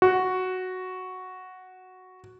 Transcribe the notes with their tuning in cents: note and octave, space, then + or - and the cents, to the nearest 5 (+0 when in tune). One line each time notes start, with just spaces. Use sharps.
F#4 +0